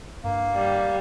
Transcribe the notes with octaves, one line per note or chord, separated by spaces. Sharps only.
G2 A#3
G3